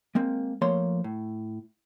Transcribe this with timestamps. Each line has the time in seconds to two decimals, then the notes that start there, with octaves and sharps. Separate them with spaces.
0.15 G#3 A#3 C4
0.62 F3 A3 A#3 C5 C#5 C6
1.04 A2